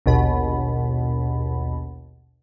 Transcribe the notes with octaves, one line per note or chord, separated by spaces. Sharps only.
A#1 D#2 B2 B5